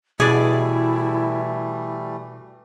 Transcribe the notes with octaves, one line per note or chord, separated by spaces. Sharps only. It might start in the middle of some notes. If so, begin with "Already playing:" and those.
B2 E3 G3 A3 E4 G#4 D5